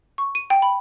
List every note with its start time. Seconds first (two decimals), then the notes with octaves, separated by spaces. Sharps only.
0.18 C#6
0.35 D#7
0.50 G5
0.62 B5